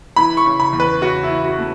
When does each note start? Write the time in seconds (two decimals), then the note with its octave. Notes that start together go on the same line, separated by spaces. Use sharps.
0.16 E3 B5
0.37 C#6
0.45 C#3
0.60 B5
0.73 E2
0.80 B4
1.02 C#3 F#4
1.23 E4
1.30 E3
1.45 F#4
1.58 A3